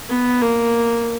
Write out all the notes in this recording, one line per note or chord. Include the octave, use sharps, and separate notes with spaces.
B3
A#3